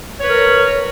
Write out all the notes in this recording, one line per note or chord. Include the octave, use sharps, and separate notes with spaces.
A#4 B4 C#5